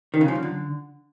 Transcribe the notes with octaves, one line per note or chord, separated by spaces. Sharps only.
D#3
C#3
F3
F#2
D3